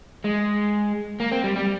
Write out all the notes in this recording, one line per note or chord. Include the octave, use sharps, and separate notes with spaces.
G#3
A#3
C4
G3
G3